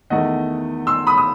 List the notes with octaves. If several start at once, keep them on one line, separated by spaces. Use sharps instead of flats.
E2 D#3 A3 D#5 F#5
C6 E6
B5 D#6
D#6